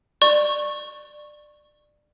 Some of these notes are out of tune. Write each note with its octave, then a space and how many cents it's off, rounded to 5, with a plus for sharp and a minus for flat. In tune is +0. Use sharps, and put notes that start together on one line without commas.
D5 +20 C#6 -15